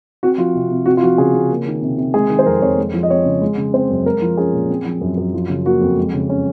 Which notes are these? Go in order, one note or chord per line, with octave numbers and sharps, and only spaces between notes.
C4 F#4
F3 F4
C3
C3
C4 F#4
F4
F3 F#4
C#3 G#4
C#3
A#3
D#3
C3
C3
G#3 G#4
D#3
C5
F2 A#4
F2 C#5
G#3
F3
D#5
C4 C#5
C#3
G#3
C#3
C4 C5
F#2
G#3 A#4
F3
C#4 G#4
A#2
C4
F3
F#2
F#2
F3
C#3
A#3 F#4
F2
G#3
C#3
C#4